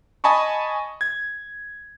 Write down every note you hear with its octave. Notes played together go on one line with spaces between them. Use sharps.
D#5 G#5 A5 B5 C#6
G#6